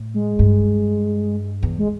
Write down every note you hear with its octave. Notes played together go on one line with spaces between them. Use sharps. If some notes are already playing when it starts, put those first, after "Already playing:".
Already playing: A2
G#3
G2
E2
G#3